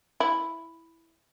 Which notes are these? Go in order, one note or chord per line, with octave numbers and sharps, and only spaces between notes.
E4